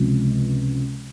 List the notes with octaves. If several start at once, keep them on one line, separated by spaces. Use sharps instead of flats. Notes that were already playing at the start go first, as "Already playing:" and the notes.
Already playing: C#2 C3 F3